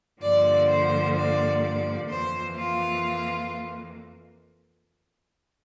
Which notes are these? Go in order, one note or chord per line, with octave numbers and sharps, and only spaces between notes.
G2 D3 F3 A#3 D5
C5
D5
D5
F2 E3 A#3 C5
F4